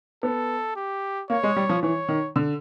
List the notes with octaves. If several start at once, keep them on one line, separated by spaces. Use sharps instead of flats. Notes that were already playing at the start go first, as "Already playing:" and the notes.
B3 A4
G4
A#3 C#5
G#3
G3
F3
E3 C#5
D#3
D3